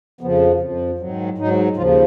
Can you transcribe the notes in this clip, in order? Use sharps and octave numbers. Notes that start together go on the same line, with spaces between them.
F2 C#3 F3 B3
F2 F3
G#2 D#3 F#3
G#2 F#3 D#4
D#2 C#3 F3 F4